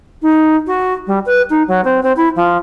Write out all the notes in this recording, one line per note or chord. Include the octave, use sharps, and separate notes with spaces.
D#4
F#4
G3
B4
D#4
F#3
C4
C4
E4
F3